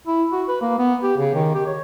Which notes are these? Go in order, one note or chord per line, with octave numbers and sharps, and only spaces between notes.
E4
F#4
B4
A#3
B3
G4
C#3
D#3
G4
C#5